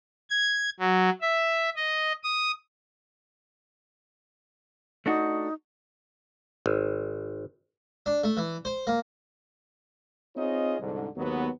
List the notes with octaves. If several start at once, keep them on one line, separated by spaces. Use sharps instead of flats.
G#6
F#3
E5
D#5
D#6
A3 D4 D#4 F#4
G#1
D4
A3
E3
C5
A#3
C4 D#4 F4 G#4 C#5 D#5
C2 G#2 D3
D#2 G#2 F#3 B3